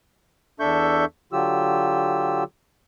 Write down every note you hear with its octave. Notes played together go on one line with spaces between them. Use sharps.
E2 D4 A4 E5 C#6 G6
D3 F#3 F4 G4 E6